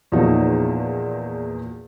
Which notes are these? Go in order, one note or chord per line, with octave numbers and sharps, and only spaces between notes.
E2 A#2 F3 F#3 D#4